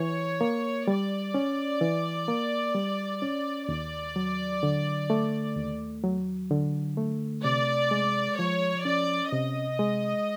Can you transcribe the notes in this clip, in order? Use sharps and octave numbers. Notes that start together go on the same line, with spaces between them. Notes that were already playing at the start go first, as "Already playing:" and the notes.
Already playing: E3 C#5
A#3
G3 D5
C#4
E3
A#3
G3
C#4
D#2 D5
F#3
D3
A3
D#2
F#3
D3
A3
C3 D5
G#3
F3 C#5
C#4 D5
C3 D#5
G#3